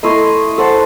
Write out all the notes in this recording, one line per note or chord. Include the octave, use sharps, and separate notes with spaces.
A3 E4 D#5 C6
A4 C5 F#5 A5